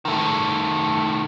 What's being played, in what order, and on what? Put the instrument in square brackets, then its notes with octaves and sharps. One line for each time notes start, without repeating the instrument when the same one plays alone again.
[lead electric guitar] D#3 A3